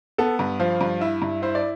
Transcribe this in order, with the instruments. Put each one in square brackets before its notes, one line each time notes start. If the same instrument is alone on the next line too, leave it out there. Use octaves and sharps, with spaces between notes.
[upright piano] B3 [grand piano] A4
[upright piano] G2
[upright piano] F3 [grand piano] F5
[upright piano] G2
[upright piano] E4 [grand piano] E5
[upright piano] G2
[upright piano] E4 [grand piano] C5
[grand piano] D5